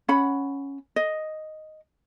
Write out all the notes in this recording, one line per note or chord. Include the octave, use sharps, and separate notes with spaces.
C#4 F#5 B5
D#5